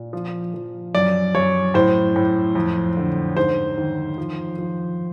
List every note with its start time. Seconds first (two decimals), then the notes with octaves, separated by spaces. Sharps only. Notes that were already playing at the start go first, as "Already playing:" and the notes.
Already playing: A#2
0.13 F3
0.54 F3
0.95 F#2 D5
1.35 F#2 C#5
1.74 A2 C5
2.16 A2
2.55 F2
2.97 D3
3.37 G#2 C5
3.78 D#3
4.18 F3
4.59 F3